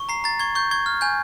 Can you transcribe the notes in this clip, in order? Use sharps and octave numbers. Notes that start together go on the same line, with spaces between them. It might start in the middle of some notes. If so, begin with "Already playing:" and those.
Already playing: C#6
A#5 C7
A#5 A6
C#6 G#6
C#6 G6
C#6 G#6
F6
G#5 G6